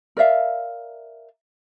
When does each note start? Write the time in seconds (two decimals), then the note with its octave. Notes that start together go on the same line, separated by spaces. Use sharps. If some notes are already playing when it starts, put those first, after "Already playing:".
0.17 A#4 D5 E5 F5